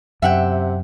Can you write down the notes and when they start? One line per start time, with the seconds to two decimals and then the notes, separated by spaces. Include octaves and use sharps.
0.22 F#2 C3 E5 F#5 G5